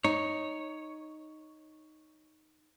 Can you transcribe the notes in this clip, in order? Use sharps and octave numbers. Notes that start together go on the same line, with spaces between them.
D#4 C#5